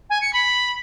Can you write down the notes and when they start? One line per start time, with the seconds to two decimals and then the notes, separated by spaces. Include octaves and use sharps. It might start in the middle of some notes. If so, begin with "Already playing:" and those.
0.10 G#5
0.21 C#7
0.33 B5